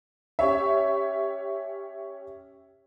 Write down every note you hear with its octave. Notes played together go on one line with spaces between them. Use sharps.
C#4 G4 C#5 E5